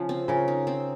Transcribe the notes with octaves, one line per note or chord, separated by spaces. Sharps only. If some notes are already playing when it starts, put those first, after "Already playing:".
Already playing: C#3 F3 G#3
C4
C#3 A#4
D#4
C4